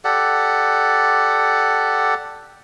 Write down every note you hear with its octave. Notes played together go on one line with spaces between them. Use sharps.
G4 A4 D5 F#5